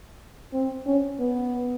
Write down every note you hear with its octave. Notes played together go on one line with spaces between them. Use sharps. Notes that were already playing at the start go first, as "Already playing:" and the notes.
C4
C#4
B3